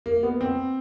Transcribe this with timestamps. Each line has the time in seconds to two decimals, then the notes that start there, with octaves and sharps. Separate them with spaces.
0.06 A#3
0.23 B3
0.41 C4